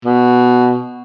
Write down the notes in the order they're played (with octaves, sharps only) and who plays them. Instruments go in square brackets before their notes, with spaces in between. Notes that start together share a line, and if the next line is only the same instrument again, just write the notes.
[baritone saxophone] B2